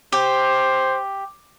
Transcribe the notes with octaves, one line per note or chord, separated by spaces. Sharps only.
G4 C5